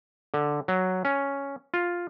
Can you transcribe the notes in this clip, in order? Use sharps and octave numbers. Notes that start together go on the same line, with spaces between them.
D3
F#3
C#4
F4